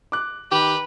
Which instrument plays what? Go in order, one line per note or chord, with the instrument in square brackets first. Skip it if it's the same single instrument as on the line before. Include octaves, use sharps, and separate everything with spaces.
[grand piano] D6 F#6
[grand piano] D#3 [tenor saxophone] G4 [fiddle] B4